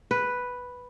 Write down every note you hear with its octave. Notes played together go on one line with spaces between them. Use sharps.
B4